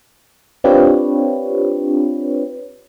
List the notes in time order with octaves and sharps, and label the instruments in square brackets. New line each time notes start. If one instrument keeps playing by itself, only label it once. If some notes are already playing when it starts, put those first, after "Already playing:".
[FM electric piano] C4 D4 F4 G4 B4 C#5